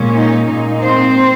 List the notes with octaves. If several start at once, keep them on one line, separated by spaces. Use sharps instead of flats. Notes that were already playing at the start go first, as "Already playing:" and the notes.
Already playing: A#2 G#3 C#4
D#4
A#2 G#3 D#4
C4 C5